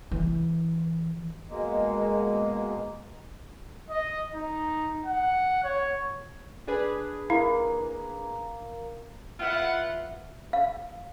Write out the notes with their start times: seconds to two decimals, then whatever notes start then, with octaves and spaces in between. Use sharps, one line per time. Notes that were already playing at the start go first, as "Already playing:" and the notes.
0.11 E3
1.50 B2 G#3 A#3
3.90 D#5
4.34 D#4
5.06 F#5
5.64 C#5
6.68 D4 G#4 B4
7.30 A#3 E4
9.39 E4 F4 B4 E5 F#5
10.53 F5